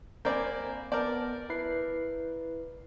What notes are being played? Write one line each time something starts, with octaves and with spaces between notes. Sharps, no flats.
A#3 C4 D5 G#5 B5 G6
B3 A#4 D5 A5 G6
E4 B4 C7